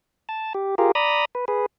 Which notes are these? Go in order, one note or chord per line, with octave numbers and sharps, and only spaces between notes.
A5
G4
F4 G4 G#4 A#4
D5 A#5 B5 D#6
B4
G#4 B4